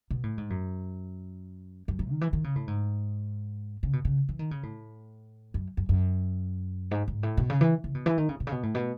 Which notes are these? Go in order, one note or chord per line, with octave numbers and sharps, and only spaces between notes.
B2
A2
G#2
F#2
F#2
G#2
D#3
E3
D#3
C#3
A2
G#2
C#3
B2
C#3
E3
D#3
C#3
A2
F#2
F#2
F#2
G#2
G#2
A2
B2
C#3
E3
C#3
B2
E3
D#3
C#3
B2
C#3
B2
A2
B2